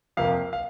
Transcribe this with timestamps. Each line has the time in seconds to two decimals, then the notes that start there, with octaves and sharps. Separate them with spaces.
0.17 F2 C3 A#3 F5
0.53 F5